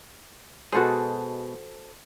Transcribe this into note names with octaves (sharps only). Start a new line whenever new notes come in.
B2 G#3 F#4 G#4 A4 C5